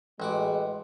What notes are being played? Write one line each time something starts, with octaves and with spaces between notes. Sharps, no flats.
A1 G#3 F#4 D6